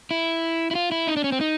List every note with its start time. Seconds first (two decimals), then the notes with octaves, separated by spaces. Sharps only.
0.11 E4
0.71 E4
0.75 F4
0.92 E4
1.07 D#4
1.17 D4
1.24 C#4
1.32 C4
1.41 D#4